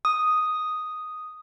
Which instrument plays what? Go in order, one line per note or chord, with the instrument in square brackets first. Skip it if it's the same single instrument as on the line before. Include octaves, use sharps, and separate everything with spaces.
[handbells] D#6